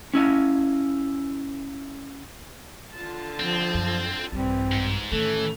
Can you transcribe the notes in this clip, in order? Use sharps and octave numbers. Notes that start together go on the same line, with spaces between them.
C#4 E4 D#5 F5
D3 F4 A5
F3 C4
F#2
A#1 G2 E3 G3 C4
G#2
A2 D#3 E3 A3 C#4 A4